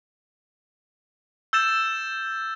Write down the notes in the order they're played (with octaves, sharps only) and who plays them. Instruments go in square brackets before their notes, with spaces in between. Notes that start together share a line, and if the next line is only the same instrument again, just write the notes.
[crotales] E6 G6 A6 E7